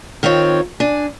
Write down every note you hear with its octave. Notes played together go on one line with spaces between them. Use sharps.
D#3 C4 F4 C#5
D4 G#5